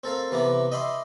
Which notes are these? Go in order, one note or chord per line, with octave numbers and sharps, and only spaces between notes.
C4 A4 A#4 F5
C3 E3 B3 A#5 D6
D#5 E5 G5 B5 C6 D6